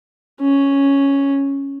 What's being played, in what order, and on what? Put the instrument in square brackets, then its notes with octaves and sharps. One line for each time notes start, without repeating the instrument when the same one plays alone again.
[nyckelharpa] C#4